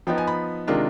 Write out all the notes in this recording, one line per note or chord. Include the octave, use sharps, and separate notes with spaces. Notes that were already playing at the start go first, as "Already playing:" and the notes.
F3 B3 D#4 G5
G#5
B5
C3 D#3 G#3 D4 F4